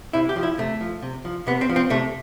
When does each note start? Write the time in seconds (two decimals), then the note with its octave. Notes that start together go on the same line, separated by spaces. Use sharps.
0.13 C3 E4
0.29 G4
0.36 F3
0.43 E4
0.58 C3 A3
0.81 F3
1.02 C3
1.25 F3
1.47 C3 B3
1.61 C4
1.69 F3
1.76 C4
1.90 C3 A3